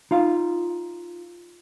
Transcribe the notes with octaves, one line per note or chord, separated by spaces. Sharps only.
D#4 F4 F5